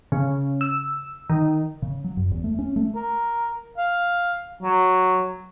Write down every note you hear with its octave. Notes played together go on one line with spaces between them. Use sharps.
C#3
E6
D#3
C#3
F#3
F#2
E2
A3
C#4
A3
A#4
F5
F#3